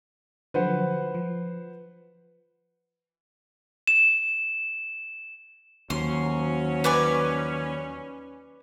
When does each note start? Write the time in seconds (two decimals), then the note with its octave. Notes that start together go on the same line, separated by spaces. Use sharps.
0.54 D3 F3 F#3 B4 C5 F#5
1.15 F3
3.87 E7
5.90 D#2 F3 F#3 C#4 C6
6.84 B4 D5 G#5